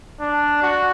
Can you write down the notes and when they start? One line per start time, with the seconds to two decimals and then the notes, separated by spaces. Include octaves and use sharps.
0.21 D4
0.62 F#4